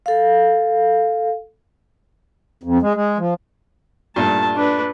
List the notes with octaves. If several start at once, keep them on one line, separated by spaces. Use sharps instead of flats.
A4 F5
F2
G#3
G#3
F3
G2 A#2 A3 A5
D4 B4